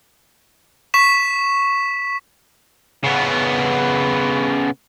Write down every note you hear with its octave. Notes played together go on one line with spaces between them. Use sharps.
C#6 B6 E7
C#3 B3